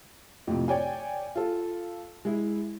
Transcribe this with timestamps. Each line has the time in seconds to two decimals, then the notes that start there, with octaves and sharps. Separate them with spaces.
0.47 F2 A2 C3
0.68 C#5 D5 G5 G#5
1.35 F4 A4
2.25 G#3 E4